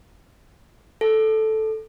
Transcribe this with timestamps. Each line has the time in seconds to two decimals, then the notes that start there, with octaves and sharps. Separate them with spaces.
1.01 A4